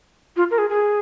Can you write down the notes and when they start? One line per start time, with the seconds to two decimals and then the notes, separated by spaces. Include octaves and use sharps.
0.37 F4
0.51 A#4
0.58 G#4
0.70 G#4